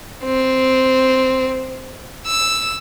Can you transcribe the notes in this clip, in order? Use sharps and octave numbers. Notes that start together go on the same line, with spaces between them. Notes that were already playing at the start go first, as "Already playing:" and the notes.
C4
E6